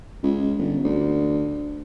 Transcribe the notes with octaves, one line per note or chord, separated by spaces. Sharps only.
C#2
G1
D2